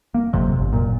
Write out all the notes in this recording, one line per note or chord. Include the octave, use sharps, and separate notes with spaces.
A#3
G1 F2 C3 F#3
G1
F#1 A#2